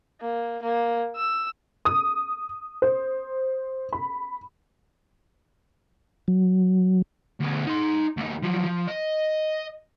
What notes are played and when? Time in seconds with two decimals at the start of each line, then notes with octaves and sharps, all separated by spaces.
0.21 A#3
0.62 A#3
1.16 E6
1.85 D#6
2.82 C5
3.93 B5
6.28 F#3
7.40 D2 B3
7.67 D#4 C6
8.17 D2 D#4
8.43 F3 F#3
8.65 F3
8.87 D#5